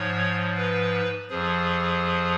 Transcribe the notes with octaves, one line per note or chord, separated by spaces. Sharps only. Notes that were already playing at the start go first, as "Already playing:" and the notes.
Already playing: G#2 F3 C#5
B4
F2 F3 G#4